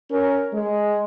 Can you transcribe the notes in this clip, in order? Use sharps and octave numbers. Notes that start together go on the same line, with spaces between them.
C#4 A#4
G#3